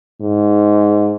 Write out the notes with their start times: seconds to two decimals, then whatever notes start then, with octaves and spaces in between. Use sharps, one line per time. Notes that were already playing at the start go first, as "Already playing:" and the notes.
0.21 G#2